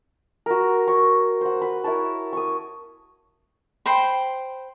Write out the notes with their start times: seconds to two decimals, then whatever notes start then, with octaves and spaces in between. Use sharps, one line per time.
0.46 F#4 A#4
0.87 C#5 C#6
1.41 C5 F#5
1.61 B4
1.84 E4 A#4 C#5 A5
2.33 C#6 D#6
3.86 C5 G5 B5